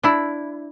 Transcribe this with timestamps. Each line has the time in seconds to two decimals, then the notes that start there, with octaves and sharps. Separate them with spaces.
0.03 D4 E4